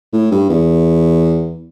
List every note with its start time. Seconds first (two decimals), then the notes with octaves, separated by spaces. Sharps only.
0.13 A2
0.32 G2
0.49 E2